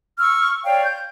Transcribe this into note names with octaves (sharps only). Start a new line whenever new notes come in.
C#6 E6 F6
C#5 D5 F5 G5
G6